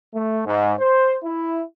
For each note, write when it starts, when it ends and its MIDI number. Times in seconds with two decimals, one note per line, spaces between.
0.14 0.43 57
0.46 0.74 44
0.80 1.16 72
1.24 1.60 64